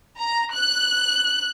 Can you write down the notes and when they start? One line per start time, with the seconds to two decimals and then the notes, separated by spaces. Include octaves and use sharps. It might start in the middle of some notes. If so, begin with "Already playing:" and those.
0.18 A#5
0.54 F#6